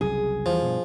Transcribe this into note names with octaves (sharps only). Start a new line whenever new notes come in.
F#1 C2 F#2 G#4
E2 E3 F3 G3
G2 B2